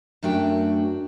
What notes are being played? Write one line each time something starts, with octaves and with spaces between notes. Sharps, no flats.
F#2 A3 D4 F#4 G5